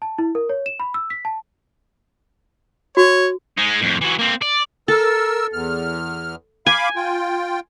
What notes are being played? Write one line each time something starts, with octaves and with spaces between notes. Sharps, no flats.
A5
E4
A#4
C#5
E7
B5
E6
B6
A5
F#4 C#5
G#3 D#4
F2 A2
E3 F#3
A#3 C4
D5
A4 A#4 E6
E2 F6
F5 G#5 B5 D6
F4 G5